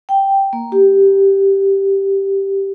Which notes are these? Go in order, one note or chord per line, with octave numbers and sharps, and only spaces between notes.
G5
A#3
G4